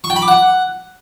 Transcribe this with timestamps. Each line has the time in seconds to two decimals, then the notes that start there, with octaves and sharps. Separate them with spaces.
0.04 C#6
0.10 G5
0.16 B5
0.22 D6
0.28 F#5